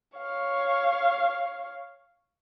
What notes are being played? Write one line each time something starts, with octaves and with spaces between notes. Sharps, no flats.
C#5 F5